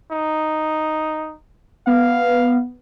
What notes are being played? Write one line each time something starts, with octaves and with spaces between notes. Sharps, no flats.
D#4
B3 F5